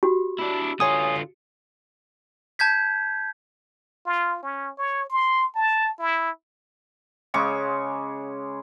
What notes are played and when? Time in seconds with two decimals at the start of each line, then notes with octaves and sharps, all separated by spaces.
0.03 F#4 G4
0.39 D4 E4
0.80 D3 F4 C#5 G#5 D#6
2.59 A5 G6 G#6 B6
4.06 F4
4.43 C#4
4.78 C#5
5.10 C6
5.55 A5
5.99 E4
7.34 C#3 G#3 C#6 D6